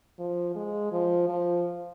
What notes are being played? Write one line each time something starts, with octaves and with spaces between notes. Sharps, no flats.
F3
G#3
F3
F3